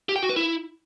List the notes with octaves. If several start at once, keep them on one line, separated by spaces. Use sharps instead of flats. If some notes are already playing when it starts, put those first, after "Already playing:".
G4
G5
F#4
B4
E4